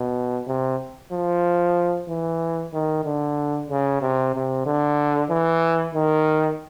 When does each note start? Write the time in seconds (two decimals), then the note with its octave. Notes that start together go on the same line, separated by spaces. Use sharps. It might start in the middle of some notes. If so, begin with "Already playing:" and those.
Already playing: B2
0.47 C3
1.12 F3
2.09 E3
2.74 D#3
3.05 D3
3.70 C#3
4.02 C3
4.34 C3
4.66 D3
5.30 E3
5.95 D#3